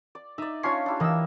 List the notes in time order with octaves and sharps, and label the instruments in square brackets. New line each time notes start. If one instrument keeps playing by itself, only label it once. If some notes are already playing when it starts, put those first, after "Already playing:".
[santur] D5
[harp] D#4 [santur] D5 E5
[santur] C#4 D4 F4 [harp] C#5 C7
[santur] D4 E4 G4
[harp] E3 E6 [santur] A#3 D#5